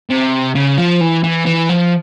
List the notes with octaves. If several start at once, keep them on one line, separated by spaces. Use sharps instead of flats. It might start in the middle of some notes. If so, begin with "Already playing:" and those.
C3
C#3
F3
E3
E3
E3
F3